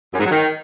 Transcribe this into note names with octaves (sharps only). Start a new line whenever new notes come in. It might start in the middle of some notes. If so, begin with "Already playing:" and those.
F#2
G#2
F#3
D#3